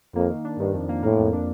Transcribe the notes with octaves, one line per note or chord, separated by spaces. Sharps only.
F2 A#3
D#3
D4
G2 D#3
F2
A#3
A2 A#3
F2
D4